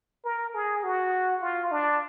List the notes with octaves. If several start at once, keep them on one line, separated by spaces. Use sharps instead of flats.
A#4
G#4
F#4
F4
D4